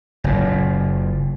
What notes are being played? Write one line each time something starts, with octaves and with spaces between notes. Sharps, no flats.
F#1 A#2